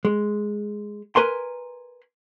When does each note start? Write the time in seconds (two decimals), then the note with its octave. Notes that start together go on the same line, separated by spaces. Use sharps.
0.05 G#3
1.16 A#4 B4 G#5 A#5 C6